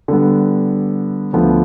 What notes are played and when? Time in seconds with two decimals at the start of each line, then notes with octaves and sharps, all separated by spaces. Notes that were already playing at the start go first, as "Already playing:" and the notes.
0.08 D3 G3 B3
1.33 D2 D3 F3 B3